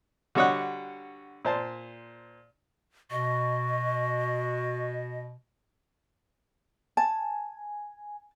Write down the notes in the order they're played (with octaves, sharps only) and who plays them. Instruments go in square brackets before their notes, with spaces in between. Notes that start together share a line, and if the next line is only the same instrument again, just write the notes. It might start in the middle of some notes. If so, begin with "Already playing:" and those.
[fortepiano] D3 G3 F#4 C#5 D#5 F#5
A#2 C5 A5
[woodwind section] B2 [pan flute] D#5 [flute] C#6
[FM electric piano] G#5 [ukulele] A5